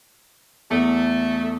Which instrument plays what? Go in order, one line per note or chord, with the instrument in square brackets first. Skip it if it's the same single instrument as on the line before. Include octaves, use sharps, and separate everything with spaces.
[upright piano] E2 [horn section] A3